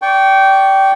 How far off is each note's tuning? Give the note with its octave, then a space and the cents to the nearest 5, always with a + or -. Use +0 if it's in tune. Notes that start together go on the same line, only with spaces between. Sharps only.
D5 -15 G5 -15 C#6 +5